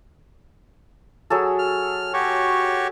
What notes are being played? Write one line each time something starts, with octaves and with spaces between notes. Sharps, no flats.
F#3 G#4 A4
F6
F#4 G4 C#5